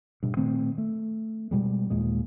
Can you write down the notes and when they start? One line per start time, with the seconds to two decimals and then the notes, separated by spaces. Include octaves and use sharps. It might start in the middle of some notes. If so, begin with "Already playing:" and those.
0.23 G2 B2
0.37 A#2 D#3 A3 C4
0.78 A3
1.51 B2 G3 G#3
1.90 D#2 A#2 G#3